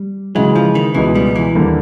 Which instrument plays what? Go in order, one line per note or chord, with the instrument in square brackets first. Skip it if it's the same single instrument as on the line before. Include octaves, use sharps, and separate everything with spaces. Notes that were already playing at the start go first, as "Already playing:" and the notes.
Already playing: [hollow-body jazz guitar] G3
[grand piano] C#3 E3 G#3 [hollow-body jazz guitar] F#3
[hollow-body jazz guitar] F3
D#3
[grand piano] C#2 B2 G#3 B3 [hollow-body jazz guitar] E3
[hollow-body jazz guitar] G3
E3
[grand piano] D#2 D3 G3 A#3